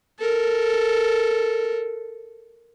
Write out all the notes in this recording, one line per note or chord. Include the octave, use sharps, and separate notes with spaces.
A4 A#4